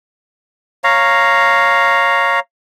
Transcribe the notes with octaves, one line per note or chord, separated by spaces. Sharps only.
C#5 F5 A#5